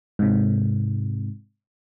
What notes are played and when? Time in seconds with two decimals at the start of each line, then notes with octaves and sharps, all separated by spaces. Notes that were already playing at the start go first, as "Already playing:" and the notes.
0.19 G#2 C3